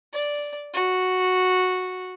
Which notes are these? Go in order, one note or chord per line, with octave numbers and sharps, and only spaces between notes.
D5
F#4